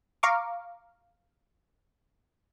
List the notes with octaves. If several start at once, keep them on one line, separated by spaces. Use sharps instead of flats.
F5 A#5 C#6 D6